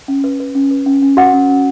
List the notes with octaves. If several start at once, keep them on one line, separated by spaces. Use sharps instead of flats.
C#4
B4
B4
C#4
B4
C#4
C#4
F#4 B4 F#5
C#4
C#4